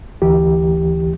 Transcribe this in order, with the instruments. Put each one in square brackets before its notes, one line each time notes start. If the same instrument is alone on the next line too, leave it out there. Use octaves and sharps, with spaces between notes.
[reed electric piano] D2 E3 G4